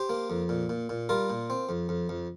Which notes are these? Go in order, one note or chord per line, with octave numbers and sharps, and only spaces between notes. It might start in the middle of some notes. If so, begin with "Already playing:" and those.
Already playing: G4 C5
A#3
F2
A#2
A#2
A#2
G3 F4 A#4
A#2
C4
F2
F2
F2